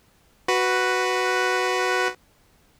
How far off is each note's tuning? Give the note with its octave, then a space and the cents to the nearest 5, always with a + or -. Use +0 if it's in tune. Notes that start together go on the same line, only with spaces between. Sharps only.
F#4 +0 B4 +0